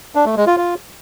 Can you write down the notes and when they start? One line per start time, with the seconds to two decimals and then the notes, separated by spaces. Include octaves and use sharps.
0.15 D4
0.26 A3
0.36 G#3
0.47 F4
0.57 F4